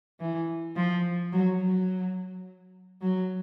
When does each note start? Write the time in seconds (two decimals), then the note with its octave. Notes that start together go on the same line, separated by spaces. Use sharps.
0.20 E3
0.76 F3
1.33 F#3
1.61 F#3
3.02 F#3